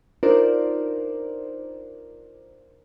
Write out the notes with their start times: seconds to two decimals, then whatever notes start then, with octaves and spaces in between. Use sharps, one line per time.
0.23 D4 D#4 F4 A#4 C5 D5